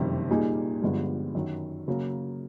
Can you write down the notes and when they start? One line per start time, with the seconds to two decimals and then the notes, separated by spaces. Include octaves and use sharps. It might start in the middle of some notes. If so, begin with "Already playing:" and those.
Already playing: F#1 F2 C3 D#3 G3
0.30 A#2 G3 A#3 D#4 G#4
0.82 G1 G2 D3 F3 G#3
1.35 F#2 D#3 F#3
1.88 C#3 F#3 A#3